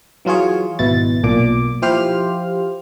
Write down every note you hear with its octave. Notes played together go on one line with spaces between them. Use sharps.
E3 F#3 F4 G#4 C#5
G#1 B2 E4 A6
B1 A#2 D6
F3 E4 G4 C5 F5 F6